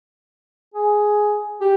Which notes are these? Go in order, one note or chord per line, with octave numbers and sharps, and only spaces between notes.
G#4
G4